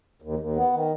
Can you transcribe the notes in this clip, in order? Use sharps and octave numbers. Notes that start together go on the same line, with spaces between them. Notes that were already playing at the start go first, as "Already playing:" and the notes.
D#2
D#2
B3
D#3